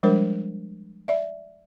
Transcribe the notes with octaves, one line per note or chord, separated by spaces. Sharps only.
F3 G3 G#3 D4 A#4 C5
D5 E5